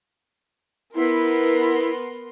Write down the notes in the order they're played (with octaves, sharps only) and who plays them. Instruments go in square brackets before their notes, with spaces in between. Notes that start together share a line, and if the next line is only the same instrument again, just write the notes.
[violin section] B3 A#4 C6 [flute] E4